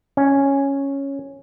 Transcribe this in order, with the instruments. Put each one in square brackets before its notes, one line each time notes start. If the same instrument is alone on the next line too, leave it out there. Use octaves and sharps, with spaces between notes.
[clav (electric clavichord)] C#4